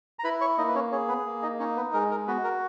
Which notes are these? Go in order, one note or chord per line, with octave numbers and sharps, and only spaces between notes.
A#5
E4 B4 B5
C#5 C#6
A#3 D#4 D#5
B4
C#4 C#5
C#4 G#4 C#5
B3 B4
A#3
D#4 D#5
C#4 D#4 C#5
B3 B4
G#3 A#4
A#4
B3 F#4 B4
A#4